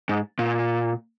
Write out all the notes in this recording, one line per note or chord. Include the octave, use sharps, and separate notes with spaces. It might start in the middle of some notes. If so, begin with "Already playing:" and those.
G#2
A#2